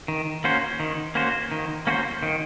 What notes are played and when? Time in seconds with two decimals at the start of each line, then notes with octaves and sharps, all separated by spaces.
0.08 D#3
0.44 A#3 C#4 F#4 C5
0.80 D#3
1.15 A#3 C#4 F#4 C5
1.52 D#3
1.87 A#3 C#4 F#4 C5
2.23 D#3